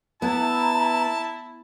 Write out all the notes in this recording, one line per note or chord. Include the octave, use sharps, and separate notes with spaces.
B3 E4 A5 A#5